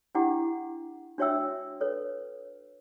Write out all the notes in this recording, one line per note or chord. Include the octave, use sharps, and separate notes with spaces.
D4 E4 G4 F#5 G5 D6
D4 F#4 C#5 E5 G5 E6
A4 B4 C#5